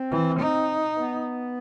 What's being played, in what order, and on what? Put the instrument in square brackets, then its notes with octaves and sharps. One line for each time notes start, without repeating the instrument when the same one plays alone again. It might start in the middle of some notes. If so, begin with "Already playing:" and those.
Already playing: [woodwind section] C4
[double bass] E3
D#4
[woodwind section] B3